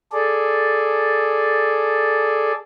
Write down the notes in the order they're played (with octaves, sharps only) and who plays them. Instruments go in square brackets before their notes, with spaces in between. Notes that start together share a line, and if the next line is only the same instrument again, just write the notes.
[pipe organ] G#4 A4 D5